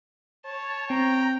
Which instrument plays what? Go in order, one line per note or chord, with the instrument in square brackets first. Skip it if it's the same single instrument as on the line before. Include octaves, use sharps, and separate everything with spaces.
[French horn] C#5 [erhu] A5
[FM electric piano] C4 [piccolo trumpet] G5 [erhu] A#5